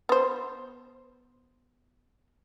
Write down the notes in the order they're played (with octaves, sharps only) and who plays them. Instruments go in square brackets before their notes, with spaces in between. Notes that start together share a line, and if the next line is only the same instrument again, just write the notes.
[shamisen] B3 C5